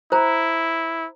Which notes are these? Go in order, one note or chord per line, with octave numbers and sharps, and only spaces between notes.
E4 C5 A#5